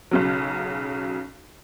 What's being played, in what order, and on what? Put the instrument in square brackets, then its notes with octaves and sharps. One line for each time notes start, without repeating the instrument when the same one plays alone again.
[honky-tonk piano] B1 C#3 F#3